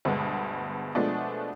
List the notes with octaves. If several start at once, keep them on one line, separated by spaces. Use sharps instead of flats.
D2 G2 B2 G#3 B3
B2 F3 G#3 A3 B3 D4